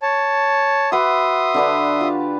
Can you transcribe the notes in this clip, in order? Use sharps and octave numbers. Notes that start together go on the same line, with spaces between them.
C#5 A5
F#4 B4 E5 C6 D#6
D3 D4 B4
F4 G4